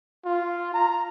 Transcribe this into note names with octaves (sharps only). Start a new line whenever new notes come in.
F4
A#5